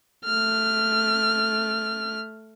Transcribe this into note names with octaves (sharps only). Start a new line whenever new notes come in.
A3 F6